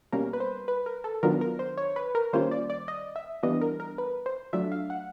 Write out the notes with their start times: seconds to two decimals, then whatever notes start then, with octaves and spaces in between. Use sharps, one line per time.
0.12 B2 G3 A#3 C#4 A#4
0.33 B4
0.40 C5
0.68 B4
0.86 A#4
1.04 A4
1.23 D#3 F#3 B3 D4 F4 A#4
1.41 A#4
1.59 C5
1.78 C#5
1.96 B4
2.15 A#4
2.33 D#3 G3 A#3 C#4 F4 C5
2.51 D5
2.70 D5
2.88 D#5
3.16 E5
3.43 E3 G3 B3 D4 F4 D#5
3.61 A#4
3.80 A#4
3.98 B4
4.26 C5
4.53 F#3 A3 D4 F4 E5
4.72 F5
4.90 F#5